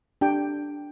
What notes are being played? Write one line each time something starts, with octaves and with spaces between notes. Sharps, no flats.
D4 G4 G5